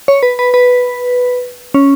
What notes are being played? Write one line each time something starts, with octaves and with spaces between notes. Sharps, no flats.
C#5
B4
B4
B4
C#4